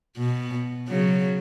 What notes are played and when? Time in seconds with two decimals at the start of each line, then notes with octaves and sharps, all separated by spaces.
0.18 B2
0.88 C#3 F#3